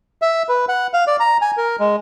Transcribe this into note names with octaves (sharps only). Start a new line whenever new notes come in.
E5
B4
F#5
F5
D5
A#5
G#5
A#4
G#3